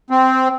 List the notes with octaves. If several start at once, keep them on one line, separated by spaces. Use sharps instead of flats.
C4